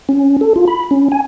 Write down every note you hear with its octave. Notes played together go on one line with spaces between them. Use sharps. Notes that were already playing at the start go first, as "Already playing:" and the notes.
C#4
A4
F4
B5
C#4
G#5